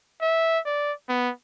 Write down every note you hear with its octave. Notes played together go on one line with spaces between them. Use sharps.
E5
D5
B3